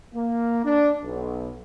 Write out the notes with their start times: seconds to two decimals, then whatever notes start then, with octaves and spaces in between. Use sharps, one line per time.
0.14 A#3
0.64 D4
1.02 B1